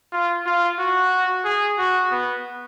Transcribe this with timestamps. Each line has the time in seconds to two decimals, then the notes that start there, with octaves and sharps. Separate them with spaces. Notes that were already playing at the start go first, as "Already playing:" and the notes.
0.12 F4
0.46 F4
0.79 F#4
1.45 G#4
1.79 F#4
2.11 B3